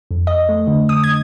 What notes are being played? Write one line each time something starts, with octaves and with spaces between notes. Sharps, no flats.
F2
D#5
A3
D3
D#6
G#6